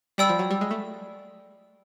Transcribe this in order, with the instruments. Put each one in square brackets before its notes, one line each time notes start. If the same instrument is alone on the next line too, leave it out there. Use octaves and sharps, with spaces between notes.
[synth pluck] G3 [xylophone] D5 G5 B5 E6
[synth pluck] F3
F#3
G3
G#3
A3